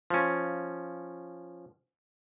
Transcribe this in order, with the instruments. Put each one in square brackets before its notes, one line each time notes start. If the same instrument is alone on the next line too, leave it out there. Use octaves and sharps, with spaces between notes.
[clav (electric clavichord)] F3 C#4